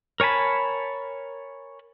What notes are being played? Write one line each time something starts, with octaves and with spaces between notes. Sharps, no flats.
A#4 C#5 G#5 A5 B5